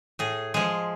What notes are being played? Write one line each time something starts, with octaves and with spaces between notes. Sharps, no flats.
A2 G#4
F3 G#3 G#4